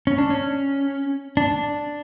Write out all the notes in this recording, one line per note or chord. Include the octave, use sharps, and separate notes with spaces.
C#4
D4
C#4
D4